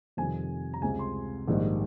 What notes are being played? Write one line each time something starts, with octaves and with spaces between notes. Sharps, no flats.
F2 C3 D#3 G3 G#5
A#5
C#2 C3 G3 G#5
C6
A#1 G#2 D#3 G3